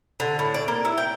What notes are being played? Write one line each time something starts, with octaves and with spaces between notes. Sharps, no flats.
D3
A2
D5
A#3
E4
G5